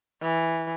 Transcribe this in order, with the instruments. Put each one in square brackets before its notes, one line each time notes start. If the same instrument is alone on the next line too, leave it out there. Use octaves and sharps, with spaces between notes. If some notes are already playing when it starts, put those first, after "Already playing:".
[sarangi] E3